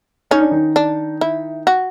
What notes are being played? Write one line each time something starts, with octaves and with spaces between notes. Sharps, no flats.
C#4 D#4
D4
D#3 D#4
D4
E4
F#4